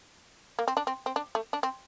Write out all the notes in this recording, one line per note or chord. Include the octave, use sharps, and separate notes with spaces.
A#3
C4
D4
C4
C4
D4
A3
D4
C4